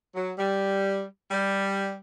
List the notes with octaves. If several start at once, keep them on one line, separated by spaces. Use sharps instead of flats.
F#3
G3
G3